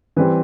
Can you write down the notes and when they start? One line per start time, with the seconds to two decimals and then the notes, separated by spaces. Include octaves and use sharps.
0.16 E3 G3 C4 B4